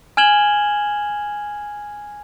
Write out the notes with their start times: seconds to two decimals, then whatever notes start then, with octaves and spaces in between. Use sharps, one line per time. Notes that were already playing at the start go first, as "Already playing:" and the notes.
0.17 G#5 F6 G#6 E7 F#7 G7